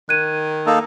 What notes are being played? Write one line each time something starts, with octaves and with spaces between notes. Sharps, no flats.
D#3 F#6 G#6 D#7
A#3 D#4 A4